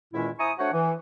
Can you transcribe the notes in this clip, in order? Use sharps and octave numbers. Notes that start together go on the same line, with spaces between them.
E2 A#2 D#3 G#3 C#4 E4
E4 C5 G#5 A#5 C#6 D#6
A3 D4 F#4 C5 C#5 F#5
E3